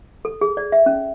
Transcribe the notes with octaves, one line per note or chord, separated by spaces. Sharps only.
A4
G#4
D5
E5
C#4